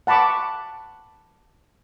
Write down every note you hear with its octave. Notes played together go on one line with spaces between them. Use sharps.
F#5 A5 B5 C#6 D6